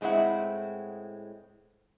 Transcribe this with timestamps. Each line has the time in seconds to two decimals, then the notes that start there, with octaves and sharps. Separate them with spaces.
0.01 A2 G#3 C4 E4 F#5